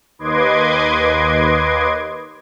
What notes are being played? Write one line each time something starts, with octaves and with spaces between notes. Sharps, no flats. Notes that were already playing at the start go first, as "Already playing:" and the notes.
D#2 B4 D#5 C6 D6 G#6